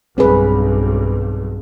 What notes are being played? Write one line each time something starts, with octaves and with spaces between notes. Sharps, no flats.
B1 G2 C4 G#4 B4